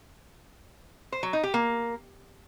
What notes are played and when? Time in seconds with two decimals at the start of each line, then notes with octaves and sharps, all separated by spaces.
1.12 C5
1.23 F#3
1.33 D#4
1.43 G4
1.54 A#3